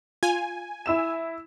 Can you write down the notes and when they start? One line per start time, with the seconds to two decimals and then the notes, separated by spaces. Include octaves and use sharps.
0.23 F4 G#5
0.86 E4 E6 E7